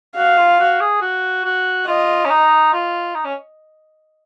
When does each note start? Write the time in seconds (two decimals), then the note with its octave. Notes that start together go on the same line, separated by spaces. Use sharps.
0.17 F#4 F5
0.38 F4
0.60 F#4
0.80 G#4
1.02 F#4
1.45 F#4
1.87 F4 D#5
2.25 C#4
2.30 D#4
2.73 F4
3.15 D#4
3.25 C#4